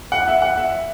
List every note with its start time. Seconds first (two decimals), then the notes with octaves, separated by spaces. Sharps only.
0.12 F#5
0.28 E5
0.42 F#5
0.58 E5